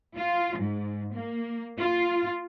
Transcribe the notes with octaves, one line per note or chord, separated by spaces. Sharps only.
F4
G#2
A#3
F4